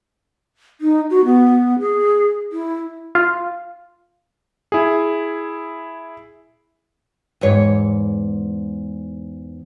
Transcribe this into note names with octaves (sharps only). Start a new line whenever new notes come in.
D#4
F#4
B3
G#4
E4
F4
E4 G#4
E2 G#2 C#5